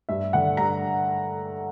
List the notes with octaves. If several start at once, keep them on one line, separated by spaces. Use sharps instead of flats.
G2 E5
D3 F#5
G2 A#5